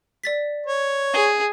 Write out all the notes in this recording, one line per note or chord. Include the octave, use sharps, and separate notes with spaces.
D5 A6 B6
C#5
G#4